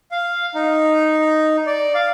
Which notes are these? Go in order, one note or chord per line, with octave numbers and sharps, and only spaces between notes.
F5
D#4
D5
F5